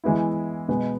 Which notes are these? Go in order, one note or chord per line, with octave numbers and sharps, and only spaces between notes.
E3 G#3 B3 E4
B2 G#3 B3